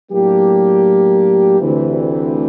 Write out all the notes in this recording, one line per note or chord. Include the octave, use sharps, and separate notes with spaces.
A2 F#3 A#3 D4 G4
D2 C3 E3